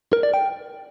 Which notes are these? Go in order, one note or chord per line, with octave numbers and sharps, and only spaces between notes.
A#4
D5
G5